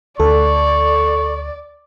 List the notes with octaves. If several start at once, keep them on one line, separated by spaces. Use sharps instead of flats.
D2 A4 D5 C#6